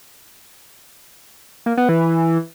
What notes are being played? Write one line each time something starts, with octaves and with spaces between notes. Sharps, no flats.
A#3
B3
E3